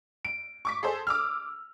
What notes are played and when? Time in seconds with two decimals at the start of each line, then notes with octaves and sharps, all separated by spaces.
0.25 D7
0.65 C#6 D6 B6
0.83 G#4 A4 C5
1.07 D6 E6 F6